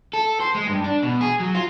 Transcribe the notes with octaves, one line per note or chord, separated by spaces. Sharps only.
A4
C5
G#3
G2
D4
B2
G#4
F#3
F4